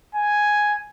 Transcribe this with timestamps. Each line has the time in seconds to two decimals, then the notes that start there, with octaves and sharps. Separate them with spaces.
0.15 G#5